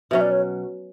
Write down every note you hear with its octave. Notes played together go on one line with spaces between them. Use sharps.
B2 F#3 C#4 E5
D5
C#5